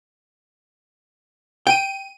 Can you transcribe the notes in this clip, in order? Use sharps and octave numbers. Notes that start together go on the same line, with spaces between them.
G5 D7 D#7